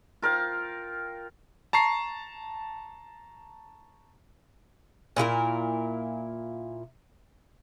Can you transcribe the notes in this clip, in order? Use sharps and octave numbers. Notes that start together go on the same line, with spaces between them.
F4 A#4 F5 G5
A5 A#5 C#6 C7
A#2 E4 F#4 A#4